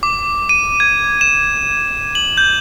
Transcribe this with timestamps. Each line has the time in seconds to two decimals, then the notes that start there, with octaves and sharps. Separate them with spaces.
0.03 D6
0.49 D#7
0.80 G#6
1.21 E7
2.15 F#7
2.37 G6